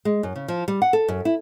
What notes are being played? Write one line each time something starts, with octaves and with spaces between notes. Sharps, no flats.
G#3
F#2
C#3
F3
G3
F#5
A4
F#2
E4